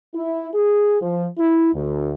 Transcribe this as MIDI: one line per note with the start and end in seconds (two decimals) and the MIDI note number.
0.14 0.48 64
0.54 0.98 68
1.01 1.27 53
1.38 1.73 64
1.74 2.12 38